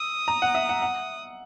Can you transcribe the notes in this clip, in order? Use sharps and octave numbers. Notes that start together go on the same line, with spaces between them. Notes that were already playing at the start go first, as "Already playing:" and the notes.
Already playing: D#6 E6
A#5
F#5
E5
F#5
F#5